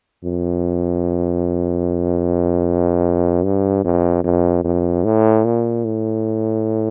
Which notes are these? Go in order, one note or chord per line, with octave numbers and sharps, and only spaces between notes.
F2
G2
F2
F2
F2
A2
A#2
A2